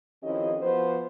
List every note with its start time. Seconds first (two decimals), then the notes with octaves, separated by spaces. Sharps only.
0.23 F2 D#3 C#4 E4 G4 D#5
0.61 F3 B3 F#4 B4 C5